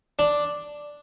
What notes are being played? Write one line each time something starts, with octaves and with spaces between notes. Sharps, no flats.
D4